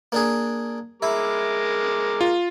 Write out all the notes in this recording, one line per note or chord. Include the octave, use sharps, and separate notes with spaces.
A#3 D4 G#4
G#3 E4 A#4 D6
F4